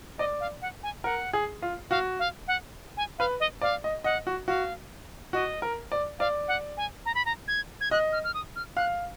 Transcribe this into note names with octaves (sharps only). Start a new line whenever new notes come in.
D5 D#5
F5
F#5
G#5
A#4 F#5
G#4
F4
F#4 F5
F5
F#5
G#5
B4 F5
D#5
D5 F5
D#5
D#5 F#5
F#4
F#4 F5
F#4 D#5
A#4
D5
D5 F5
F#5
G#5
A#5
B5
A#5
G#6
G#6
D#5 F#6
F6
F6
D#6
F6
F5 F#6